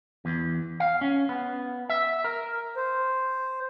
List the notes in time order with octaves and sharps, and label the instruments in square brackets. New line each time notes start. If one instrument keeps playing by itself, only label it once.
[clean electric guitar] E2
F5
C#4
B3
E5
A#4
[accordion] C5